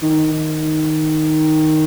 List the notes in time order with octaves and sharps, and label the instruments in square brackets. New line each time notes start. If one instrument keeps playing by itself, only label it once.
[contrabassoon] D#3